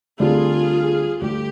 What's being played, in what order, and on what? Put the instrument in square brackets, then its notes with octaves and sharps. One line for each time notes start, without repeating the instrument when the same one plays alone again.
[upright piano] D2 D3 G3 C4 [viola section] F4 G#4
[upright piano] D2 D3 G3 [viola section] G4